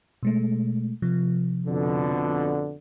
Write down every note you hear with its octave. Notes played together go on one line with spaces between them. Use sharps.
B2 G#3 A3
C3 F3
F2 B2 D3